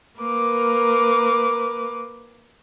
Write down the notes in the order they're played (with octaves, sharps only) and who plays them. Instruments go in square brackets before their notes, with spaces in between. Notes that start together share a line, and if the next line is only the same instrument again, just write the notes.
[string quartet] A#3 A#4 B4 D6